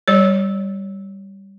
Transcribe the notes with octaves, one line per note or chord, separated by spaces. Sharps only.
G3 C#5